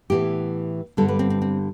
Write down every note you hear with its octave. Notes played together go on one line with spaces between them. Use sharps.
A2 E3 B3 G4
G2 D3 G3 B3 A4
B4
C4
C4
C4